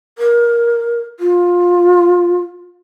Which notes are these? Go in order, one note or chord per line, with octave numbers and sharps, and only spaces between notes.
A#4
F4